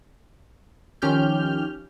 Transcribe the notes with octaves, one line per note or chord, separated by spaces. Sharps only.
D#3 F3 C#4 G4 F6 G6